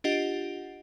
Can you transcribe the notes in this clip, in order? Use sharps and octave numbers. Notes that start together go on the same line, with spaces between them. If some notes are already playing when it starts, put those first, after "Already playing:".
D4 F4 G4 D#5 F#5